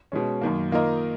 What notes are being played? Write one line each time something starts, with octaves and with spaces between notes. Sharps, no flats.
B2 G#3 C#4
F#2 D#3 A#3
D#3 A#3 F4 A#4 D#5